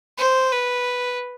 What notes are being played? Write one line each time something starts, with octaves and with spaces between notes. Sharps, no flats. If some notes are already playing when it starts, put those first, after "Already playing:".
C5
B4